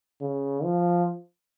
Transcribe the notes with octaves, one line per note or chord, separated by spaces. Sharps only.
C#3
F3